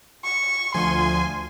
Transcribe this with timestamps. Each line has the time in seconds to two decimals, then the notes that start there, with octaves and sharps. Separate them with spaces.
0.24 C#6
0.74 D2 F3 G#5 C6